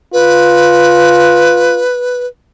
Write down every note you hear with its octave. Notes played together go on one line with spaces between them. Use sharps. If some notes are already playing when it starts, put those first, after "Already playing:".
F4 B4